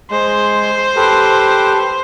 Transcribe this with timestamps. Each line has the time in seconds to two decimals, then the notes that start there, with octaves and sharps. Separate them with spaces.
0.11 G#3 C5
0.96 G4 A4 B4